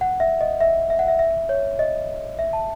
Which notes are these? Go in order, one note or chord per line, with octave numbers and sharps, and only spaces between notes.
F#5
E5
D#5
E5
E5
F#5
E5
E5
C#5
D#5
E5
A5